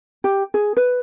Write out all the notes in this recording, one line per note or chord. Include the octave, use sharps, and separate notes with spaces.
G4
G#4
B4